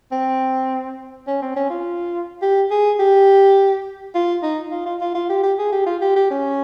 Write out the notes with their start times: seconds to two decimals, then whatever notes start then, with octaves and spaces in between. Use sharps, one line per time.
0.12 C4
1.27 C#4
1.42 C4
1.56 C#4
1.70 F4
2.42 G4
2.71 G#4
3.00 G4
4.15 F4
4.43 D#4
4.71 F4
4.86 F4
5.01 F4
5.15 F4
5.29 G4
5.43 G4
5.58 G#4
5.72 G4
5.86 F4
6.02 G4
6.16 G4
6.31 C#4